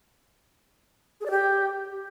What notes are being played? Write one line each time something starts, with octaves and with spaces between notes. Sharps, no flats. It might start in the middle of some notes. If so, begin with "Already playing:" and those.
G#4
D5
G4